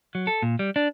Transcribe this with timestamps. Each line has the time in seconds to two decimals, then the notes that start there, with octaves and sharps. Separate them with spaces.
0.15 F#3
0.27 A4
0.42 A#2
0.59 G3
0.76 D4